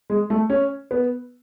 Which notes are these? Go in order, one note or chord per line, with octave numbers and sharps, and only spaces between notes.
G#3
A3
C#4
B3